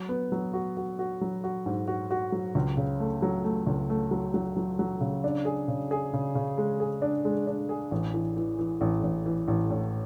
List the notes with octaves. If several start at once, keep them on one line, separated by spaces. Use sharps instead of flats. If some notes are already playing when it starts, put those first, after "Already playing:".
Already playing: F#3
B3
F#3
F#4
F#4
F#4
F#3
F#4
G#2
F#4
F#4
F#3
C#2
C#3
A3
F#3
A3
C#2
A3
F#3
F#3
F#3
F#3
C#3
D4
G#4
C#3
G#4
C#3
C#3
G#3
G#4
D4
G#3
D4
G#4
A1
E3
E3
E3
A1
A1
E3
A1
A2